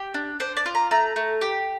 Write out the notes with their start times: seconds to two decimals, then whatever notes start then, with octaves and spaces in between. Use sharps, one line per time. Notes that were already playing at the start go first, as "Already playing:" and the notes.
Already playing: G4
0.14 D4
0.40 D4 C5
0.57 D5
0.66 F4
0.75 A#5
0.91 A3 A#5
1.16 A3
1.41 G4